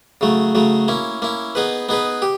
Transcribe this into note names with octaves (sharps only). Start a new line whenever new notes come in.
C#3 F#3 A3
C#3 F#3 A3
A#3 C#4 E4
A#3 C#4 E4
B3 D#4 G#4 B4
B3 D#4 G#4 B4
G4